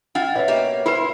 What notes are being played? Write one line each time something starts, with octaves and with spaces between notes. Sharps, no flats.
C#4 E4 F4 F#5
B2 C#5 D#5 E5
A#3 G4
E4 F4 B4 C5